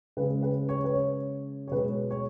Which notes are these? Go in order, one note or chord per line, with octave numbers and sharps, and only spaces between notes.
C#3 G#3 B4
B4
C#5
B4
C#5
C#5
B2 G#3 B4
C#5